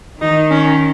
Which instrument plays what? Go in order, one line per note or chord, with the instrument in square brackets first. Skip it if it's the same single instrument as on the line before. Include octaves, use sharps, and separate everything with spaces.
[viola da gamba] D#3 [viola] D#4
[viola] C#4